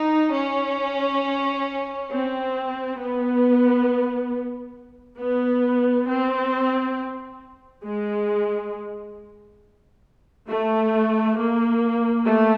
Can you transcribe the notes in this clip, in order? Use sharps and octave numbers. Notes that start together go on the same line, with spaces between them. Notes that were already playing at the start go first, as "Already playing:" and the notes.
Already playing: D#4
C#4
C4
B3
B3
C4
G#3
A3
A#3
A3